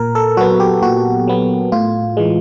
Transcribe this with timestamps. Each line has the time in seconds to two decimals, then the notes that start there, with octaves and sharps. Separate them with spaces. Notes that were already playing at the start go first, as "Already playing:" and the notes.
Already playing: A#2 A#4
0.15 A4
0.37 F#3 B3 F#4
0.60 G4
0.82 A#2 F#4
1.28 F#3 B3
1.72 A2 F4
2.17 E3 G#3